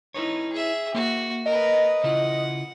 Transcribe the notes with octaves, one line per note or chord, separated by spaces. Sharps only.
D#4 E4 B4 C#5
G#4 E5
A#3 F#4
A#4 B4 D#5
C#3 E4 F4 F#5